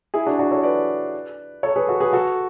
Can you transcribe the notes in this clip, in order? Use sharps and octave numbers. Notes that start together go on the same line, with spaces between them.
E4 G#4
D4 F#4
D4 F#4
A4 C#5
B4 D5
A4 C#5
G#4 B4
F#4 A4
G#4 B4
F#4 A4